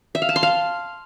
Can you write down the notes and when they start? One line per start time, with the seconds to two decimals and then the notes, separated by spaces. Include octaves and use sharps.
0.15 E5
0.22 F5
0.29 A5
0.36 C6
0.43 F5